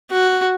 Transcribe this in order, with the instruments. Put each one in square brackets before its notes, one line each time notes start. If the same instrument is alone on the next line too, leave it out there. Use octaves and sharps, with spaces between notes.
[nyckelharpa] F#4